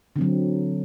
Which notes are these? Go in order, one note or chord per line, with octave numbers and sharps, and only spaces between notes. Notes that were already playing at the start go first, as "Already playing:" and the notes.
D3 F#3 C4